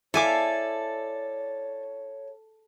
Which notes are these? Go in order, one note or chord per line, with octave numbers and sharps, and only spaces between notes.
E4 A4 C#5 D5 E5 F5 G#5 D6